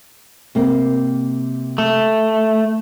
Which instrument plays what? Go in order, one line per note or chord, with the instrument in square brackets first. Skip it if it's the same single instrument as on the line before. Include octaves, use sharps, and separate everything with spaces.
[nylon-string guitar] C3 A#3
[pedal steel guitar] A3